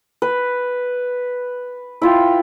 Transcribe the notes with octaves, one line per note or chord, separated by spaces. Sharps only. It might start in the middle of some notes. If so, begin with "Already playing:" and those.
B4
E4 F4 G5